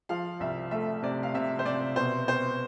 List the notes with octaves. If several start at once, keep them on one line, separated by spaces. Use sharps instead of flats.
F3 F5
C2 E5
A3 E5
C3 D5
F5
C3 E5
C5
C3 D5
B2 C5
B3 C5